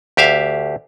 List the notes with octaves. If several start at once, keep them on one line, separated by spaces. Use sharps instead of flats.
D2 G4 E5 F5